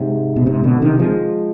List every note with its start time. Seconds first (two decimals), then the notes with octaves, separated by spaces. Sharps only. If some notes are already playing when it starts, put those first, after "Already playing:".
Already playing: G#2 C3
0.36 B2
0.46 G#2 C3
0.64 B2 D3
0.82 C3 D#3
0.99 F3 G#3